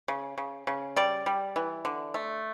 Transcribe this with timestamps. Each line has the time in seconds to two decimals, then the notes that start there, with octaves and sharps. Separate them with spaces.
0.08 C#3
0.38 C#3
0.67 C#3
0.96 G3 D5
1.26 G3
1.56 E3
1.85 D3
2.14 A3